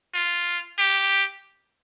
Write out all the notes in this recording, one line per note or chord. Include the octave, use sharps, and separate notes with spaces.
F4
G4